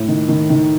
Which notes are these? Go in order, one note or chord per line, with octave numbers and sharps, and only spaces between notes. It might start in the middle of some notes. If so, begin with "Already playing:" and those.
Already playing: A2
D#3
D#3
D#3